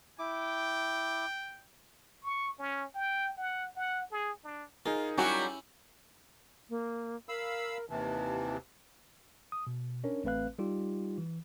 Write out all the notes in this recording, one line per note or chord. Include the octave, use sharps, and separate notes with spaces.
E4 G5 D6
C#6
C#4
G5
F#5
F#5
G#4
D4
D#4 F4 G#4 A#4
F#3 G3 C#4 E4 F#4
A#3
A#4 F5 B5 E6
D#2 C3 E3 A5
D#6
B2
C#4 D4 A#4 C#5
A1 A3 C4 B4 F5 F#6
G3 D#4 F4 G4
E3